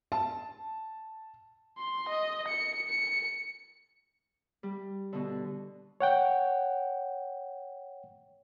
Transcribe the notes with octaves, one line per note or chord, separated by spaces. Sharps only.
A5
C6
D#5
C#7
C#7
G3
B2 D3
C#5 F#5 G5